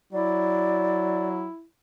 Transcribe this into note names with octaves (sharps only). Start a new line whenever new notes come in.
F#3 E4 D5